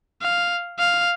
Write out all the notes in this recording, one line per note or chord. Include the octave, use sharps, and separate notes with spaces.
F5
F5